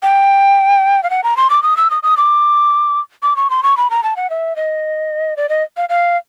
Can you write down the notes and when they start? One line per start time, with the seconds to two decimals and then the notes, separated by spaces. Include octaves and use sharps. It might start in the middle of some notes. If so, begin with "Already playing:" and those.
0.03 G5
1.03 F5
1.10 F#5
1.24 A#5
1.37 C6
1.50 D6
1.63 D#6
1.77 E6
1.90 D#6
2.03 D#6
2.17 D6
3.23 D6
3.36 C#6
3.50 C6
3.63 C#6
3.77 B5
3.90 A#5
4.03 A5
4.16 F#5
4.30 E5
4.56 D#5
5.37 D5
5.49 D#5
5.77 F5
5.89 F5